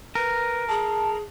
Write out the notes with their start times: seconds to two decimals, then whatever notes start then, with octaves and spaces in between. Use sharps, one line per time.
0.15 A#4 B4
0.69 G#4 A5